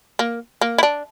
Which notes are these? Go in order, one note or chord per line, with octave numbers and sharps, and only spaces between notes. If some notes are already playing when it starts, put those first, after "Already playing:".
A#3
A#3
E4
D4